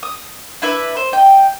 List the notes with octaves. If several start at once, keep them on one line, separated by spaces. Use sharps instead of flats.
D#6
D4 E4 B4 E5
C5
D#5 G5